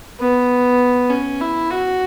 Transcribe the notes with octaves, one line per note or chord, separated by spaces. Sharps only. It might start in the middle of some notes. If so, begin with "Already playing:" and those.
B3
C#4
E4
F#4